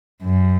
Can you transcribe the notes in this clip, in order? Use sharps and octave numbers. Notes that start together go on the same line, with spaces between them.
F#2